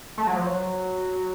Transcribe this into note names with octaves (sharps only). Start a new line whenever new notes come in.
A3
F#3
F3
F#3